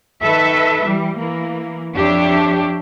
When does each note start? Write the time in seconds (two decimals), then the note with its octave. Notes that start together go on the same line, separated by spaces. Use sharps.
0.21 D#3 A4 B4 E5
0.84 E3 G3
1.18 E3 A#3
1.94 F2 D4 G4 C#5 E5